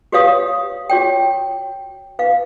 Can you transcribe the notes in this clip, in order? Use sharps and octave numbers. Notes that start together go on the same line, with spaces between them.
F#4 G4 B4 C#5 F5 D#6
F#4 C#5 G5
B4 F5